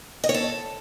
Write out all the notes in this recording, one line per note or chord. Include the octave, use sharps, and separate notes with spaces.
D#5
C#5
A4